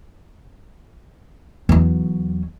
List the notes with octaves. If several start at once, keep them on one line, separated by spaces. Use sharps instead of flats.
E2 F#3